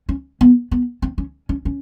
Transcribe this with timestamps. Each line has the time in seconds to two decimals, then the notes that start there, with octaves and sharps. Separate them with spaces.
0.09 C#4
0.41 B3
0.71 B3
1.02 C4
1.18 C#4
1.49 C#4
1.65 C#4